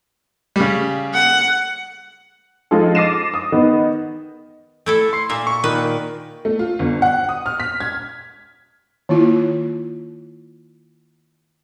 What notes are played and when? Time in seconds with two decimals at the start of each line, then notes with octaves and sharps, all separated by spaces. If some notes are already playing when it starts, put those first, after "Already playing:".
0.56 C#3 G3
1.14 F#5
2.71 F3 G#3 D#4 F4 A4
2.95 D6 A6 A#6 C7 D#7 E7
3.34 D#6
3.52 D#3 B3 D#4
4.86 A3 E4 A4
5.13 C6 C7
5.29 A#2 A#3 E5
5.47 C#6
5.64 A#2 D#3 A#4 B4
6.45 A3
6.59 F4
6.79 G1
7.02 F#5
7.29 D#6
7.46 F6
7.60 B6
7.80 G#6
9.09 D#3 A#3 E4 F4